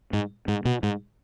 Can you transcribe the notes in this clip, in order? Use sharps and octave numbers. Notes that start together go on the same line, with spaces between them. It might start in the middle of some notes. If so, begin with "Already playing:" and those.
G#2
G#2
B2
G#2